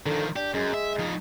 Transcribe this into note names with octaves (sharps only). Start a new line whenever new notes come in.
D3 D#3 F3
D4 G4
F#2 G#3
E5
F3 D#4